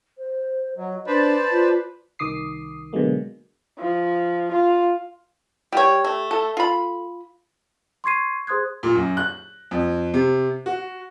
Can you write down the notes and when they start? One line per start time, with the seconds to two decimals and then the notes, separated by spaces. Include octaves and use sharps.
0.18 C5
0.77 F#3 D#5
1.07 D4 B4 C5 D5 A5
1.51 F4
2.19 C2 D#3 D6 D#6 C7
2.93 B2 D3 F#3 G#3 A#3
3.79 F3
4.52 F4
5.72 G3 G4 C#5 G5
6.04 A3
6.31 A4
6.57 F4 B5
8.04 C6 C#6 G#6 C7 D#7
8.47 G#4 C5 C6 D#6 F#6 G#6
8.83 A#2
8.95 F#2
9.17 F#6
9.71 F2
10.14 C3
10.66 F#4